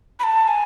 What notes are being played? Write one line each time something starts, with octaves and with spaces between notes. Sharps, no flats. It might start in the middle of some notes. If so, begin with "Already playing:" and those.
B5
A5
G#5